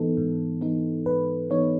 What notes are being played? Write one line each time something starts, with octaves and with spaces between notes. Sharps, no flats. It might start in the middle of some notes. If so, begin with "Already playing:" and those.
Already playing: G#2 E3 B3 D#4 A4
G#2
E3 B3 D#4
G#2 B4
E3 B3 D#4 C#5